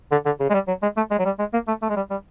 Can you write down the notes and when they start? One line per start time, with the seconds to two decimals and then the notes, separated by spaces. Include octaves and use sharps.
0.11 D3
0.26 D3
0.40 C#3
0.50 G#3
0.54 G3
0.68 F#3
0.82 G#3
0.97 A3
1.11 G#3
1.19 F#3
1.25 G3
1.39 G#3
1.53 A#3
1.68 A3
1.82 A3
1.90 G#3
1.96 G3
2.10 G3